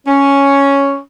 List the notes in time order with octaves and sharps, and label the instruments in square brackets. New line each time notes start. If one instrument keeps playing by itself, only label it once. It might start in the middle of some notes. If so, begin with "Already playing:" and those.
[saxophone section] C#4